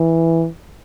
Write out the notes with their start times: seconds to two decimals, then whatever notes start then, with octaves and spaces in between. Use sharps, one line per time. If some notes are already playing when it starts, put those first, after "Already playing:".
Already playing: E3